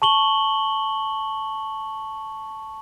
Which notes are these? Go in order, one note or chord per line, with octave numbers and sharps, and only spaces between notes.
A5 C#6 F#7 G7